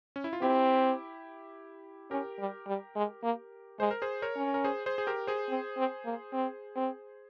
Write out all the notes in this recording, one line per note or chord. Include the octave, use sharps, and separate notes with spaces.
C#4
E4
F4
C4 E4 G4
C#4 G4 A#4
G3
G3
G#3
A#3
G#3 C5
A#4
G#4 C5
A#4 C#5
C#4
A#4
G#4 C5
G#4 C5
G#4
G4 A#4
G#4 C5
C4
C4
A#3
C4
C4